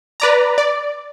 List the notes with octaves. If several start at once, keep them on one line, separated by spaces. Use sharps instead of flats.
B4 D5 A#5
D5